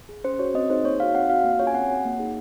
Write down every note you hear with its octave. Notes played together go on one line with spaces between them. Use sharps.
G#4
C#4 C5
F#4 C#5
C4 D#5
D#4 G#4 C5
A#3 C#5
D#4 F#4 F5
C4 F#5
F#4 F5
A#3
C#4 F4 G#4 C#5
G#5
C4 F#5
F#4
A#3
D#4 G#4